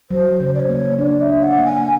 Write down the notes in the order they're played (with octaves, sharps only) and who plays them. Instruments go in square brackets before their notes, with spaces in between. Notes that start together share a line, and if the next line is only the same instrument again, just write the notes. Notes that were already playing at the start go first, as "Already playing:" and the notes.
[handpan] F#3 [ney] C5
[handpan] C#3
[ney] D5
C#5
[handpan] A#3
[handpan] D4 [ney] D5
[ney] E5
[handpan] D4
[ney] F#5
[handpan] A#3
[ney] G#5